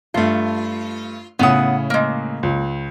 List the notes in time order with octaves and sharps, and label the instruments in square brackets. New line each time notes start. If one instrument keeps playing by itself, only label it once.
[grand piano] G2 A3 [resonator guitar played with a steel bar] F4
[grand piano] A2 C#3 D#6 [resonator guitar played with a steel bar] B3 F#5
[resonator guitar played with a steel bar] G#3 A#3
[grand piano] C#2